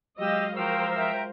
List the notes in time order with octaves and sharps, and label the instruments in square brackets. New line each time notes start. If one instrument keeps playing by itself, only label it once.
[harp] F#3 G#3 [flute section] G4 E6 [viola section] D#5 F5
[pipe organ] F3 F5 E6 [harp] F4 C#5 [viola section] A#4 C5 [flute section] G5
[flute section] E5 G5 A#5